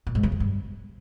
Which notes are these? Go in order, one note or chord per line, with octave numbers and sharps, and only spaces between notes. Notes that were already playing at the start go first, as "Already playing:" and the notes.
A#2
G#2
C#3
F2
G2